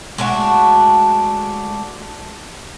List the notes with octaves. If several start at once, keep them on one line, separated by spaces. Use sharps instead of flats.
G#3 A3 D4 F#4